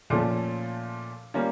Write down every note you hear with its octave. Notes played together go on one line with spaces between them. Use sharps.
A#2 F3 A3 C#4
G3 A#3 C#4 F4